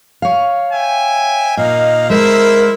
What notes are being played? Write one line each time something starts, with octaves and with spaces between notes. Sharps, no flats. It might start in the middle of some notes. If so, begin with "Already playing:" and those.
C#5 F5
E5 G5 G#5
A#2 A#3 D#4 D#5 F5
G#3 E4 A#4 C5 E5